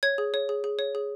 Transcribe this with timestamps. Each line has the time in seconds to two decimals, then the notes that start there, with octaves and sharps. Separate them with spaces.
0.03 C#5 G#6
0.18 G#4
0.34 C#5
0.49 G#4
0.64 G#4
0.79 C#5
0.95 G#4